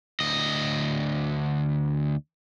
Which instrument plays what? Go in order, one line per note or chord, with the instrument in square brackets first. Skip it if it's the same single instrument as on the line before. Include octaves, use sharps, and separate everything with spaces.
[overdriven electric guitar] D2 D#5